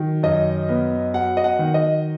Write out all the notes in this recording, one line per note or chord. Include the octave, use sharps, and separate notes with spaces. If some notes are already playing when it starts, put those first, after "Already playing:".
Already playing: D#3 F#3
F#2 D#5
B3
F#3 F#5
D#5
F#5
D#3
D#5